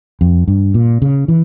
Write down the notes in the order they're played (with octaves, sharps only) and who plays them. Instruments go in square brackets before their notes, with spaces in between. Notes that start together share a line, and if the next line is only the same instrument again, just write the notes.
[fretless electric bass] F2
G2
A#2
C#3
E3